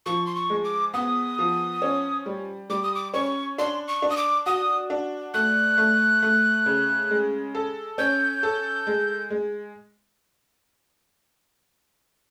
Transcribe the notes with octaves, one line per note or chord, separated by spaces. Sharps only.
F3 C#6
C6
C#6
G#3
D6
B3 D#6
F3
C#4
G3
G3 D6
D#6
D6
C#4 C#6
D4 C6
C#6
D4
D#6
D6
F#4 D#6
D4
A3 F#6
A3
A3
C#3
G#3
A4
C#4 G6
A4
G#3
G#3